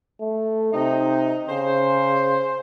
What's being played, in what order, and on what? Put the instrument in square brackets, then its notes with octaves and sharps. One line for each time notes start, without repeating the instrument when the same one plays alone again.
[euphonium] A3
[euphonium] C3 [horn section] D#4
[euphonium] C#3 [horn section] C5